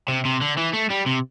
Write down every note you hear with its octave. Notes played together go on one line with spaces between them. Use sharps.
C3
C3
D3
E3
A3
G3
C3